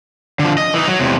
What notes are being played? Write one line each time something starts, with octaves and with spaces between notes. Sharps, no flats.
D3 F3
D#5
E3 D#4
F#3
E2 C3